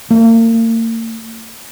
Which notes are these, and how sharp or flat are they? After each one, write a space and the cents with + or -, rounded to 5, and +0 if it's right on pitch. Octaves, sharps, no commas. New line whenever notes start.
A#3 -40